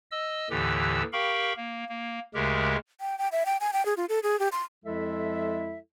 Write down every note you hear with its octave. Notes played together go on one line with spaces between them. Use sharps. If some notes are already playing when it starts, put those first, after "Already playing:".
D#5 E6
D#2 A2 D3 E3 G4 E6
G4 A#4 F5 G5 B5 C#6
A#3
A#3
D2 C#3 G#3 G4 A#4
G5
G5
E5
G5
G#5
G5
G#4
F4
A4
G#4
G4
C6
F2 F3 G#3 E4 A4 E5